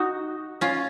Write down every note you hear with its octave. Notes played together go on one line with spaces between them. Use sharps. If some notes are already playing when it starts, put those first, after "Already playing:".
Already playing: D#4 F#4
C#4 F4